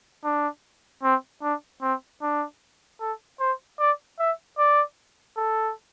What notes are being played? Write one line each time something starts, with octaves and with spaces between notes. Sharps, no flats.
D4
C4
D4
C4
D4
A4
C5
D5
E5
D5
A4